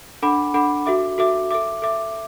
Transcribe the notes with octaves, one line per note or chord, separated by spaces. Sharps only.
D4 A4 F#5 B5 D6
D4 A4 F#5 B5 D6
F#4 A4 E5 D6
F#4 A4 E5 D6
A4 E5 D6
A4 E5 D6